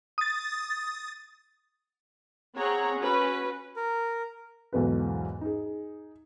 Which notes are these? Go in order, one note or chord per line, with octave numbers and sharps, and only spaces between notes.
D#6 A6
C4 G#4 C#5 F#5 A#5
C#4 F#4 B4
A#4
B1 E2 G#2 B2 A4 B4
D#4 G#4